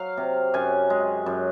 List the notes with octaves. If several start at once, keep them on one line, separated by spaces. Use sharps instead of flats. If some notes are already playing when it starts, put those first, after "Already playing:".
Already playing: F#3 F5
C3
F#2 G#5
G#3
F#2